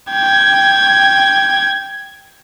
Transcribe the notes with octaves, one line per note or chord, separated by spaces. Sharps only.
G5 G#6